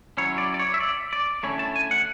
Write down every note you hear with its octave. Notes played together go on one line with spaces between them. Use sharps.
F#3 C#4 E4 C#5
D5
D5
C#5
E5
D5
D5
D3 A3 C#4 E4 C#5
A5
G#5
F#5